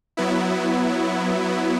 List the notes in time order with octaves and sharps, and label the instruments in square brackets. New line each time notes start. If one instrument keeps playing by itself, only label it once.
[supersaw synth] F#3 B3 E4